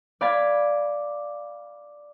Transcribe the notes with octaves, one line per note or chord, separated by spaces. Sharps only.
D5 F5 B5 G#6 A6